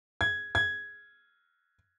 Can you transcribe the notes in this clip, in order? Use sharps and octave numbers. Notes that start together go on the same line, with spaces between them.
G#6
G#6